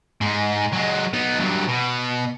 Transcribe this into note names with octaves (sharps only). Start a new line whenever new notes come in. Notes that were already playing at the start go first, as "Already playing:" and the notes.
G#2 G#3
F#3 G#3
B3 D#4
G2 F#3
B2